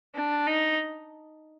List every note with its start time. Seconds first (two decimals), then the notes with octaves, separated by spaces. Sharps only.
0.15 D4
0.47 D#4